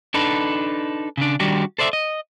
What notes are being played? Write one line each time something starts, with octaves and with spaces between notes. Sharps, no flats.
D4 D#4 A4 B4
C#3 D4
D#3 G3 D4 D#4 F#4 G4
A4 C5 D5 E5
D#5